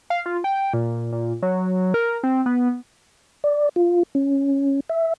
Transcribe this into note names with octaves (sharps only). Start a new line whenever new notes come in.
F5
F4
G5
A#2
A#2
F#3
A#4
C4
B3
D5
F4
C#4
E5